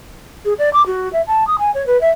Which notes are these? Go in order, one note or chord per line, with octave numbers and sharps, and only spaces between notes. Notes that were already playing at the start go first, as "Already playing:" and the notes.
G#4
D5
D6
F#4
E5
A5
D#6
G#5
C#5
B4
E5